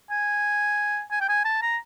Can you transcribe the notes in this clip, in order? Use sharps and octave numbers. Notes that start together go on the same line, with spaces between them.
G#5
G#5
G5
G#5
A5
A#5